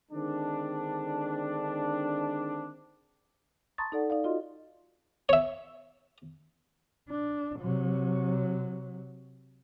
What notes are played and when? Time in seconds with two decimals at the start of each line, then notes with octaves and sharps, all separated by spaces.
0.12 D3 D#3 G#3 C4 D4
3.78 A5 A#5 C6 C#6 D#6 A6
3.92 D#4 A4 D5 F#5
4.10 D#4 D5 F5
4.24 F4 F#4 D#5 C6
5.29 C#5 E5
7.10 D4
7.60 C3 F#3